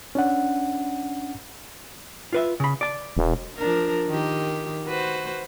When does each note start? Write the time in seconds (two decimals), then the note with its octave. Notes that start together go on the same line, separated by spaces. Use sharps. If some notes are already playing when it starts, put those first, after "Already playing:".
0.15 C#4 D4 F#5
2.33 F4 B4 E5
2.60 C#3 B5
2.81 D5 A5
3.17 E1
3.57 F3 D4 A#4
4.07 D#3 G4
4.86 F#4 B4 C5